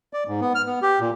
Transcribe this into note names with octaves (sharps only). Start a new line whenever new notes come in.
D5
G#2
B3
F6
B3
G4
A#2